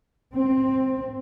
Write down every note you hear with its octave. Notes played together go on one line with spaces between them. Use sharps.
C4